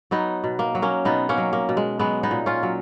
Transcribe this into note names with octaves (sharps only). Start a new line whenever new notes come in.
F#3 B3 D#4
B2
A#3
F#3
A#3 C#4
B2 B3 D#4
A#3 C#4
F#3
A#3
B2
G#3
F#3 G#3 B3
B3 D#4
A#2
C#4 F4
F#3